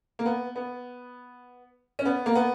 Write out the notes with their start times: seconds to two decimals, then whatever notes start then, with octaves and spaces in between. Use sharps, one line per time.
0.19 A#3
0.25 B3
0.56 B3
1.99 C#4
2.05 B3
2.26 A#3
2.35 B3